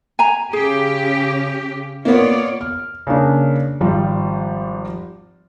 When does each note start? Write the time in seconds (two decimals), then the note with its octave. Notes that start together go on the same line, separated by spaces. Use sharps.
0.19 G#5 A#5
0.53 C#3 C#4 G4 G#4
2.05 A#3 B3 F4 C#5 D5
2.61 F6
3.07 C#3 A#3 D4
3.80 G#1 F3 G3